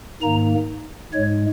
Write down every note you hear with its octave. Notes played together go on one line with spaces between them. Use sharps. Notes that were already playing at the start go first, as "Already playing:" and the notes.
G#2 D#3 A#3 A#5
G#2 G#3 C#5